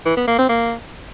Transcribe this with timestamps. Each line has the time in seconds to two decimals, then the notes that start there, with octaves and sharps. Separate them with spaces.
0.06 E3
0.17 B3
0.28 A#3
0.38 C4
0.49 A#3